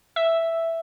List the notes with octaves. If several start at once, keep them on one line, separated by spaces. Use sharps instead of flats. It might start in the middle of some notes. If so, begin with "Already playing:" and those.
E5